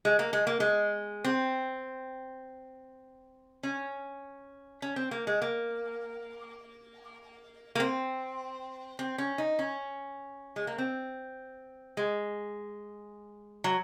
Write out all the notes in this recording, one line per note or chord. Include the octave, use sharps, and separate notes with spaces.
G#3
A#3
G#3
A#3
G#3
C4
C#4
C#4
C4
A#3
G#3
A#3
A#3
C4
C4
C#4
D#4
C#4
G#3
A#3
C4
G#3
F#3